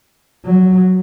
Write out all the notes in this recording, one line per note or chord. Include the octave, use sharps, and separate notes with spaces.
F#3